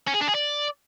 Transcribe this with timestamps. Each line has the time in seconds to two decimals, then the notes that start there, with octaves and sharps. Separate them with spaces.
0.07 C#4
0.14 G#4
0.21 D4
0.28 G#4
0.35 D5